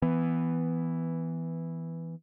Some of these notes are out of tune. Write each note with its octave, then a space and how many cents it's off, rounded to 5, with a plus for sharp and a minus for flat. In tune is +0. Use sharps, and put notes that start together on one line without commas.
E3 +0 B3 +10